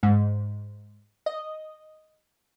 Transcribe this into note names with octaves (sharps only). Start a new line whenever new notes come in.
G#2
D#5